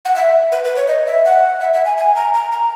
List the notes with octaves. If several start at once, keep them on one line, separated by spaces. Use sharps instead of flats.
F#5
E5
B4
B4
C#5
D#5
E5
F#5
E5
E5
G#5
G#5
A#5
A#5
A#5